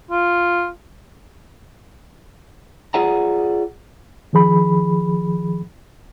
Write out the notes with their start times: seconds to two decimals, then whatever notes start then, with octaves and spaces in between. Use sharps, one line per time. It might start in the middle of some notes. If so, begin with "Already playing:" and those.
0.11 F4
2.94 F4 G#4 D5 F#5 A#5
4.33 D#3 F3 G#4 B5